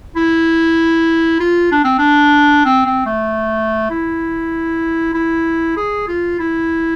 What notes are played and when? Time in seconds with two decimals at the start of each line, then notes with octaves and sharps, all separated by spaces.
0.16 E4
1.40 F4
1.71 D4
1.84 C4
1.98 D4
2.65 C4
2.86 C4
3.06 A3
3.90 E4
5.14 E4
5.77 G#4
6.07 F4
6.39 E4